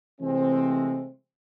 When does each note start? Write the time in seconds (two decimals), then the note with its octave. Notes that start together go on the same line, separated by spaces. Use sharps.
0.21 C3 E3 G#3 A3 C4